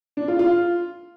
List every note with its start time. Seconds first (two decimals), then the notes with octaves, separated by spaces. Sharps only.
0.17 D4
0.28 F4
0.39 F4